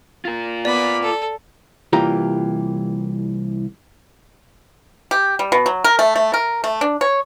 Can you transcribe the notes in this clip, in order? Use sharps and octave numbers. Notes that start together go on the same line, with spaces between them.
F4 A#4
B3 D5 B5 D6
A4
C2 E3 A#3 F4 G4 A#5
G4
G3
B2
F#3
A#4
A3
A3
A#4
A3
D4
C#5